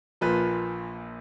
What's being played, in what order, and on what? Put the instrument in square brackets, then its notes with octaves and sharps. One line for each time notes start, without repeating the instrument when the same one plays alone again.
[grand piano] A#1 A#2 F3 B4